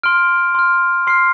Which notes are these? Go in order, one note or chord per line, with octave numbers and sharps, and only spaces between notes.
C6 F6 D7
C6 F6
C6 F6 C7